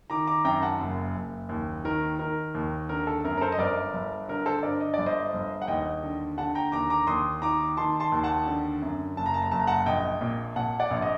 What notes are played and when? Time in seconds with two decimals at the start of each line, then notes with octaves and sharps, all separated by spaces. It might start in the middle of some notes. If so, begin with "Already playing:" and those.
0.10 D#3 A#5 D6
0.27 A#5 D6
0.45 F#2 G5 A#5
0.62 F#5 A5
0.81 F#1
1.15 F#1
1.49 D#2
1.84 D#3 A#4
2.19 D#3 A#4
2.55 D#2
2.89 D3 A#4
3.07 A4
3.24 F#2 A#4
3.37 A#4
3.41 A4 C5
3.52 D#5
3.58 G1 A#4 D5
3.94 G1
4.29 D3 A#4
4.46 A4 C5
4.63 G2 A#4 D5
4.81 D#5
4.94 G1 D5
5.06 C5 D#5
5.33 G1
5.62 F#5
5.68 D#2 D#5 G5
6.03 D3
6.37 D3 F#5 A5
6.55 G5 A#5
6.72 D#2 A#5 D6
6.90 A#5 D6
7.07 D#2 C6 D#6
7.42 D#3 A#5 D6
7.77 D#3 A5 C6
8.00 A5 C6
8.12 D#2
8.24 F#5 A5
8.47 D3
8.82 F#2
9.17 F#1 A5
9.26 A#5
9.34 A5
9.42 A#5
9.51 F#1 A5
9.60 A#5
9.67 F#5 A5
9.86 A#1 D#5 G5
10.21 A#2
10.56 A#2 F#5 A5
10.80 D5 F#5
10.91 A#1
11.02 D#5